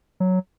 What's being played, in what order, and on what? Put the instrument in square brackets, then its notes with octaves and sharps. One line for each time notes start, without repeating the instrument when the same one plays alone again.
[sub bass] F#3